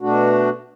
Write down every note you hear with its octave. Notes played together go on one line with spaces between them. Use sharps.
B2 A3 D4 F#4